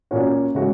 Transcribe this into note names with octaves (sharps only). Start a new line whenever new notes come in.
A#2 A#3 C#4 F#4
C#3 G#3 F#4